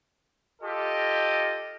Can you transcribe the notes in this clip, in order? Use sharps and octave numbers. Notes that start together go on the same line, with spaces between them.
F4 G4 A4 D#5